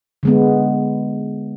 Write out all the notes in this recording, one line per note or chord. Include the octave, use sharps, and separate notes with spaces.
D3 G#3 B3